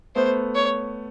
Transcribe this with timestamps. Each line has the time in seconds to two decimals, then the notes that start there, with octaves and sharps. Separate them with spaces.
0.15 A3 B3 C5
0.55 C#5